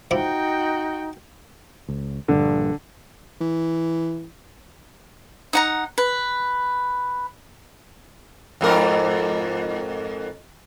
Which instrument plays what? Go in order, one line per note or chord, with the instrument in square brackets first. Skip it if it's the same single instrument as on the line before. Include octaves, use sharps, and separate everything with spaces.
[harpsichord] F3 E4 D6 [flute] D#4 [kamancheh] F#4 G5
[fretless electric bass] C#2
[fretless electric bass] A#1 G2 [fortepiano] D3
[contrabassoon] E3
[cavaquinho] D#4 F#5 A#5
B4
[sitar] F2 G#2 A#4